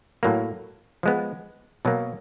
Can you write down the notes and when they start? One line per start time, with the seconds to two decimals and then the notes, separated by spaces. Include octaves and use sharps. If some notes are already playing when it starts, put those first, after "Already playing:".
0.23 A2 F#3 A#3
1.03 F3 G#3 B3
1.85 B2 F#3 A#3